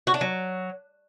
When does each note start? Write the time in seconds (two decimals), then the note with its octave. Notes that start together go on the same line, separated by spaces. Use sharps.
0.07 F#4
0.14 D4
0.21 F#3